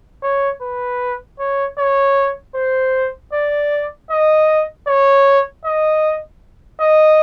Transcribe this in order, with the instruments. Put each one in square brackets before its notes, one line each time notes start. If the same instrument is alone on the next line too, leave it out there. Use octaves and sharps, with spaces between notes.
[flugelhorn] C#5
B4
C#5
C#5
C5
D5
D#5
C#5
D#5
D#5